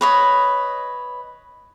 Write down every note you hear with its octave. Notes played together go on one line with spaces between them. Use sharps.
B4 C#5 D#5